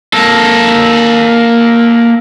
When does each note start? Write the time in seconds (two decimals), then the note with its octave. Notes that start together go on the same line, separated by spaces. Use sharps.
0.13 A#3 A4